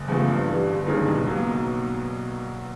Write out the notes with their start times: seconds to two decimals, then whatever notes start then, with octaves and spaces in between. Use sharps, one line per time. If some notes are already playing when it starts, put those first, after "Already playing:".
Already playing: F#1
0.08 E2 C#3 F3 A3
0.28 G2
0.48 E3 G3
0.67 G1
0.87 G2 D#3 G#3 C#4
1.06 B1
1.27 B2 F#3 A#3